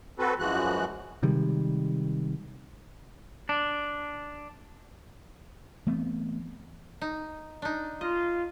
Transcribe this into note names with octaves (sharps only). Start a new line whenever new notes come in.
C4 F#4 A4 B4
F#2 E3 F3 G#3 F#4 F#6
C3 D#3 G3 G#3
D4
E3 A3 B3 C4
D#4
D4 D#4
F4 D#5